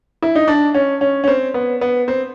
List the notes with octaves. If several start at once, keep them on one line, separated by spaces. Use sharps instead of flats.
E4
D#4
D4
C#4
C#4
C#4
C4
B3
B3
C4